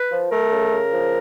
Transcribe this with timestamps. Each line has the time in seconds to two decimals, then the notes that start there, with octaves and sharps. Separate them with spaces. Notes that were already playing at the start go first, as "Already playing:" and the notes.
Already playing: B4
0.11 F3
0.31 A3 A#4
0.51 C#3
0.72 C#3
0.91 F3